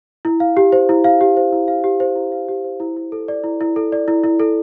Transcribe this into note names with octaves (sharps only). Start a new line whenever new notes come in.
E4
F5
G4
C5
E4
F5
G4
C5
E4
F5
G4
C5
E4
F5
G4
C5
E4
E4
A4
D5
E4
E4
A4
D5
E4
E4
A4